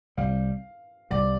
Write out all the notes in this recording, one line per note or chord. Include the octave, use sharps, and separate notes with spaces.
C2 C3 G3 F5
C2 C3 G3 D5